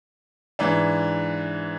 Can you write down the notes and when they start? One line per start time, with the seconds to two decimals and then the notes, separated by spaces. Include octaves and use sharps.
0.59 G#2 E3 D4